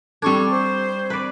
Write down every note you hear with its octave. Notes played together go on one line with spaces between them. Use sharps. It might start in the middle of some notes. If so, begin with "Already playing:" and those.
G3 C4 D4 A4 C#6 G#6
C5
B4 D5